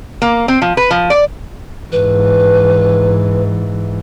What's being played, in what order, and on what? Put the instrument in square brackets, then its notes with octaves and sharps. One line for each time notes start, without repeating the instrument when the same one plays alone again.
[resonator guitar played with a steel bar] A#3
C4
F3
B4
F3
D5
[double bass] G#2 E3 [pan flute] B4